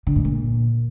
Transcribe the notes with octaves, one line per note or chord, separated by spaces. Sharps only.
D3
G#2
A#2